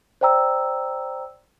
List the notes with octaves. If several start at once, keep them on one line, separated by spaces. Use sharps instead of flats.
C5 D5 G5 A#5 E6